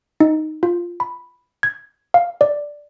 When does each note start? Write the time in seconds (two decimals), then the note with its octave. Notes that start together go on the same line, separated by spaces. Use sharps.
0.20 D#4
0.63 F4
1.00 B5
1.63 G#6
2.14 F5
2.41 D5